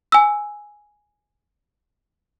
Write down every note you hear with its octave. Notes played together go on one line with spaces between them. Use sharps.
G#5 E6